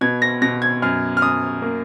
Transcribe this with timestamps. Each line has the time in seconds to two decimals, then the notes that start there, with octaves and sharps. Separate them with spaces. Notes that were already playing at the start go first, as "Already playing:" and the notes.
0.01 B2 G#6
0.22 A#6
0.42 B2 A#6
0.62 G#6
0.82 F#2 F6
1.17 F6
1.22 F#2 D#6
1.62 A#3